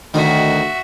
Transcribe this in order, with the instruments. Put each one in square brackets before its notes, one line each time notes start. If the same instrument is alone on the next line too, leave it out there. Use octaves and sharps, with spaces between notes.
[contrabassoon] D2 [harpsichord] D#3 [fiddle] F#4 E5